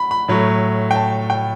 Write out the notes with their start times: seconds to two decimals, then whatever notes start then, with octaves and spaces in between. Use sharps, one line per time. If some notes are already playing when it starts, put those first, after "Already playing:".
Already playing: B5
0.11 B5
0.28 A2 F#3 A3
0.91 G5
0.96 A5
1.30 G5